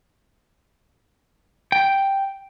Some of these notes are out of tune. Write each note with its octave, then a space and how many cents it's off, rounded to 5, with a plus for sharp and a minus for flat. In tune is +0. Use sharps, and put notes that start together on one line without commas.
G5 +0